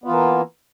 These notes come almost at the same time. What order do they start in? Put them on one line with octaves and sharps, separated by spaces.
B3 F4 E3 A#3